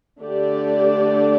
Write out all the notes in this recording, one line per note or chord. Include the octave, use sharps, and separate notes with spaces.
D3 A3 D4 G4 D5